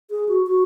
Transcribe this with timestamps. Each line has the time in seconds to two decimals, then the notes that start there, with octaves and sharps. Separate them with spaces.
0.10 G#4
0.28 F#4
0.47 F#4